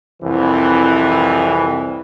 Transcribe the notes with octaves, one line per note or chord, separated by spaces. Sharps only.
C2 F2 E3